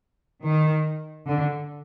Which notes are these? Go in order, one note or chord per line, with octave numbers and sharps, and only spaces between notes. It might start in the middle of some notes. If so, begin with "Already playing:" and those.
D#3
D3